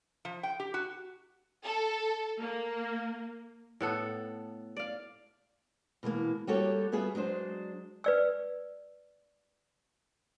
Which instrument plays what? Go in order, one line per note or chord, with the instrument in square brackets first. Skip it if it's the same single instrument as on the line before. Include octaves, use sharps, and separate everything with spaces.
[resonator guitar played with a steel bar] F3
G5
G4
F#4
[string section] A4
A#3
[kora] A2 B3 A4
D5 F5
[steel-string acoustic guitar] B2 E3 G#3 A#3
G3 A#3 F#4 G4 A4 C#5
G3 B3 F4 G#4 E5
F#3 G#3 D4 C5
[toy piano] B4 D5 E6